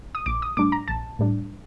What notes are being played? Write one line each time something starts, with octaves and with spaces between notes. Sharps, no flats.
D#6
A#1 D6
D#6
A2 G3 D4 D6
A#5
A#1 A5
A2 G3 D4